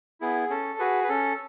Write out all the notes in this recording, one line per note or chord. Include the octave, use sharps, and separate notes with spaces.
B3 E4 G#4
C#4 A4
F#4 G#4 B4
B4
C#4 A4